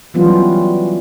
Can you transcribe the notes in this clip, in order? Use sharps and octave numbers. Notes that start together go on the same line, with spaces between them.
E3 F#3 G3 B3 C#4 F4